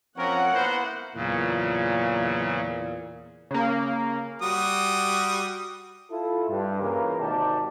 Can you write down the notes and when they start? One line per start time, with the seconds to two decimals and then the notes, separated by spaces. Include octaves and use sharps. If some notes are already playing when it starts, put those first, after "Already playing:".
0.17 F3 C4 C#4 A#4 C#5 F#5
0.53 A#3 B3 E4 A#4 C5
1.15 E2 A#2 C#3 F#3
3.51 C#3 A#3
4.42 G3 F#4 D#6
6.10 E4 F4 A4
6.49 G2
6.81 A#2 C#3 E3 A#3 G4 A#4
7.20 G#1 G#2 C3 G4 D5 A5